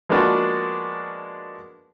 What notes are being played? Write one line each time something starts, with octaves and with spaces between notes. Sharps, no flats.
F3 G#3 A#3 B3 D4 F#4